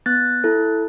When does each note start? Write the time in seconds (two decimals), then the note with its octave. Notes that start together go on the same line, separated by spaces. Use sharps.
0.06 B3 F#6 A6
0.44 E4 A4